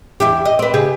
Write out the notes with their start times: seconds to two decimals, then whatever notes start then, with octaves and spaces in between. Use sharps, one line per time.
0.20 E2 E4 G4
0.45 D#5
0.59 C4 B4
0.74 C#3 G4 G#4